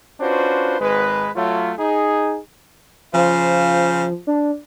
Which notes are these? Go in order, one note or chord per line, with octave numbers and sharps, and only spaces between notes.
C#4 D4 F4 F#4 B4 C5
G#1 G#3 B4
F#3 A3 F4
D#4 G#4
C#3 F3 F4 C5
D4